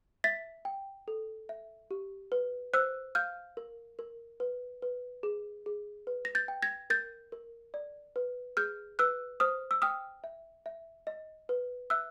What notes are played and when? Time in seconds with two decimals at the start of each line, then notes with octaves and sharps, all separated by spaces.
0.24 E5 A6 B6
0.65 G5
1.08 A4
1.49 E5
1.91 G4
2.32 B4
2.73 C5 E6 F#6
3.15 F5 F6 G6
3.57 A#4
3.99 A#4
4.40 B4
4.82 B4
5.23 G#4
5.66 G#4
6.07 B4
6.25 A#6
6.35 G6 A6
6.48 G5
6.62 G#6 A#6
6.90 A#4 G6 A6
7.32 A#4
7.74 D5
8.16 B4
8.57 G#4 F6 G6
8.99 B4 E6 F#6
9.40 C5 D#6 F6
9.71 E6
9.82 G5 D#6 F6
10.24 E5
10.66 E5
11.07 D#5
11.49 B4
11.90 E5 E6 F#6